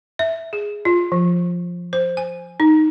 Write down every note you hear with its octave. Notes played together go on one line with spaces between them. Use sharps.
E5
G#4
F4
F3
C5
G#5
D#4